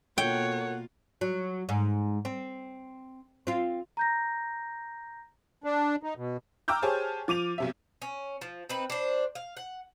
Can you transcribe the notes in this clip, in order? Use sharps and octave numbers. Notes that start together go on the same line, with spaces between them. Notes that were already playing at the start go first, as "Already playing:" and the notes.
B2 A#3 F4 A4 A#4 C#5 F#5 G5
F#3
G#2
C4
C4 F4
A#5 G6 A#6
D4
D#4
B2
G5 A#5 D6 E6 F6 G6
G4 G#4 C5 C#5 G#5 A5
F3 D6 D#7 F7
B1 C3 E5
C#4
F3
C4 D#4 B4
D4 C5
F5
F#5